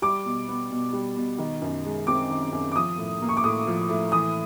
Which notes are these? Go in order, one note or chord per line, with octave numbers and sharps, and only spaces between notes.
G3 D6
B2
B3
B2
G3
B2
D#3
F#2
G#3
C4 D6
D#3
F#2
D6
F3 D#6
A2
A#3
C#6
D6
A2 D#6
F3
A2
E3 D#6